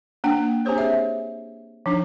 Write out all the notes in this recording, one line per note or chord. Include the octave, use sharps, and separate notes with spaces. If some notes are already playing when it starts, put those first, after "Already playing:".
A#3 D4 G5
C4 D4 G4 G#4 C5 C#5
E5
F3 D4 D#4